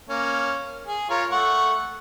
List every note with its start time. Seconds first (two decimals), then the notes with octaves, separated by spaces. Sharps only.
0.09 A#3 C#4
0.87 G#4
1.10 F4 A#4 C#5
1.31 A3 F#5 C#6